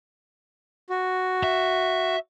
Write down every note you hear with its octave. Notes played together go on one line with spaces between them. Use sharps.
F#4
E5